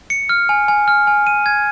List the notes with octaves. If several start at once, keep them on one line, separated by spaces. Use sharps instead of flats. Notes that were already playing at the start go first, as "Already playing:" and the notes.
C#7
F6
G#5
G#5
F6
G#5
D#7
G#6